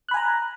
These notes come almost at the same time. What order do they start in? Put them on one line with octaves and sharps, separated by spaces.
F#6 B5 G#5 A#5